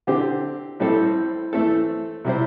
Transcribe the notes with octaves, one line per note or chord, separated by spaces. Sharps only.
D3 C4 G4 C5
A2 G3 C4 A4 C5
E3 A3 C4 A4
C3 G3 E4 C5